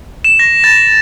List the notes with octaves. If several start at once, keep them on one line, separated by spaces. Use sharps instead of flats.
E7
A#6
A6